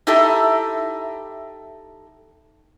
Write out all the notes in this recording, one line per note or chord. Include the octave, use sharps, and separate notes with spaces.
D#4 E4 G4 A4 E5